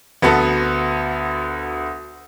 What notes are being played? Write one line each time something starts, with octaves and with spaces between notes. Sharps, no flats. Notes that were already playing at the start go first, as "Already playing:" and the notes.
D2 B3 F#4 A4